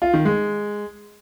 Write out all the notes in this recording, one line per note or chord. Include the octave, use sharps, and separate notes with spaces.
F4
D#3
G#3